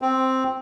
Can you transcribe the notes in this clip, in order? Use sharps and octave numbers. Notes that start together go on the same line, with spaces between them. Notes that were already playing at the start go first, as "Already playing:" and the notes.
C4